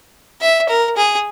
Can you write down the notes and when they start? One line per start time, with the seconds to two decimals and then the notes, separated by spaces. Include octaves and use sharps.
0.41 E5
0.69 A#4
0.97 G#4